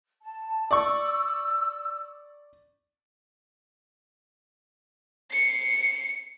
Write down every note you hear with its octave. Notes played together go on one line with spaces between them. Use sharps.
A5
D5 C#6 E6
C7 C#7